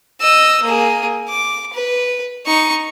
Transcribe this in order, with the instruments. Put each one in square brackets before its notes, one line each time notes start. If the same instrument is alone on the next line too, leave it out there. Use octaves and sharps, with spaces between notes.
[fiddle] D#5 E6
A#3 G#4
D6
B4
D#4 C#6